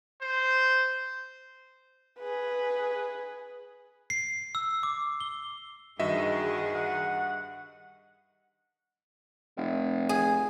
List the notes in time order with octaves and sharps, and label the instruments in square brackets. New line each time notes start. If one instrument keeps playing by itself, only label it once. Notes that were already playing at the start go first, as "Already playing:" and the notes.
[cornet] C5
[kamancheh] G#4 B4
[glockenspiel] C7
E6
D6
G7
[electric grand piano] G2 D#5 E5 [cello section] D#3 G#4 [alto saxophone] F#4
[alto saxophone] F#5
[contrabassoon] F1
[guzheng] G#4